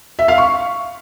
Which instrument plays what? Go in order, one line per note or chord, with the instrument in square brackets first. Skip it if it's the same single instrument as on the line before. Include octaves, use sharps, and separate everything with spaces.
[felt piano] E5
F5
C#6